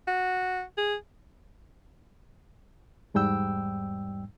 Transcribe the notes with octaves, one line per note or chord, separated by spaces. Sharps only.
F#4
G#4
E2 G#2 G3 G5 E6